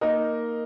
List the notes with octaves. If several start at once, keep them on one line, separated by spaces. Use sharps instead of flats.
A#3 D#4 A#4 D#5